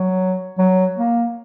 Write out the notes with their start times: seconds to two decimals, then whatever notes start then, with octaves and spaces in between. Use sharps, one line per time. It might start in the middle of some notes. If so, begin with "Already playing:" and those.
Already playing: F#3
0.59 F#3
0.98 A#3